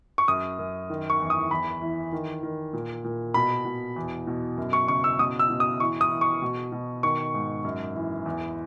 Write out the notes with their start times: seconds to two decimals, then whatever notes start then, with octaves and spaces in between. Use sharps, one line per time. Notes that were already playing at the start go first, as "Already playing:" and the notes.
0.18 C#6
0.28 F#2 D#6
0.59 F#2
0.90 D#3
1.10 C#6
1.20 E2
1.30 D#6
1.51 E2 B5
1.81 E3
2.12 D#3
2.43 D#3
2.73 A#2
3.04 A#2
3.34 B2 B5
3.65 B2
3.96 E2
4.27 B2
4.57 F#2
4.73 C#6
4.88 C#3 C#6
5.04 E6
5.19 B2 D#6
5.39 E6
5.50 B2
5.60 D#6
5.80 E3 C#6
6.01 D#6
6.11 E3
6.21 C#6
6.42 B2
6.72 B2
7.03 D#3 C#6
7.34 G#2
7.64 F#2
7.95 E3
8.26 E2